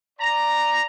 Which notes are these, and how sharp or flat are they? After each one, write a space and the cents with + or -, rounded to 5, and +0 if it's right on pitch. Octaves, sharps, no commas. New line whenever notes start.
D5 +0 A#5 +0